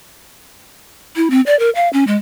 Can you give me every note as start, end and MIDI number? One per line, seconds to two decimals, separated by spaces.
1.16 1.28 64
1.30 1.41 60
1.46 1.57 74
1.59 1.70 70
1.75 1.89 77
1.93 2.04 61
2.07 2.16 56